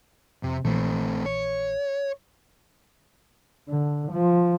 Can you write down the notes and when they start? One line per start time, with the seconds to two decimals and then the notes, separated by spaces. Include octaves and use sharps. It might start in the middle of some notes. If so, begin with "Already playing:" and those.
0.43 F2 C3
0.65 A#1 A#2 E3 A3 C4
1.26 C#5
3.68 D3
4.12 F3